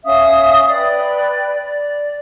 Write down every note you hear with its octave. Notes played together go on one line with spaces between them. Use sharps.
C#4 E5 F5 D#6
B4 D5 G5
D5